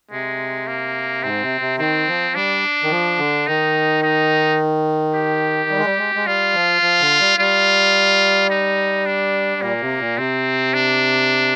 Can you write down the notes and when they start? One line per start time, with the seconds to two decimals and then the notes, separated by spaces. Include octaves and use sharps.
0.11 C3 G#3
0.67 A#3
1.23 G#2 C4
1.42 C3
1.61 C3
1.79 D#3 C4
2.07 F3
2.35 G3 D4
2.83 D#3
2.91 F3
3.18 D3
3.47 D#3 D#4
4.02 D#4
5.14 G4
5.70 G3
5.78 G#3
5.85 G3
5.98 G#3
6.15 G#3
6.26 G3 F4
6.54 F3
6.82 F3
7.01 D3
7.20 G3
7.38 G3 F4
8.50 D#4
9.06 D4
9.62 A#2 A#3
9.81 C3
9.99 A#2
10.17 C3 C4
10.74 D4